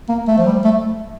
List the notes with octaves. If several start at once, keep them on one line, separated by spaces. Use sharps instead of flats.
A#3
A3
F3
G3
A3